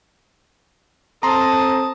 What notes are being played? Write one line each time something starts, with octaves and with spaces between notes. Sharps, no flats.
C4 A4 A5 A#5 C6 D#6